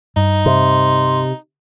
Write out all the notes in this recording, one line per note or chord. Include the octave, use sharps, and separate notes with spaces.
G2 D#4
C3 C6